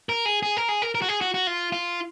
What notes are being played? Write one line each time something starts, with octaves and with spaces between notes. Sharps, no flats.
A#4
G#4
G#4
A#4
G#4
A#4
A#4
F#4
G#4
F#4
F#4
F4
F4